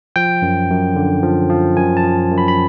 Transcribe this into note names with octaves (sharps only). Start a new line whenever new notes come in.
F3 G5
F#2
F#2
D3
F3
F3
F#2 G#5
A5
F3
F#2
B5
B5